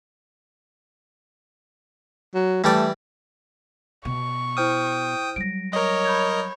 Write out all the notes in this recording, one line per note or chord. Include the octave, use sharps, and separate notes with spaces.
F#3
E3 G3 A3 D5
B2 C#6
E4 C5 G5 D#6 F6
F#3 G3 A#6 D7
A#4 C#5 D#5
B5 G6 G#6